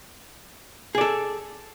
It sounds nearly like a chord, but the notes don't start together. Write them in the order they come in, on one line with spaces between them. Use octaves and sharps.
G#4 D5 A4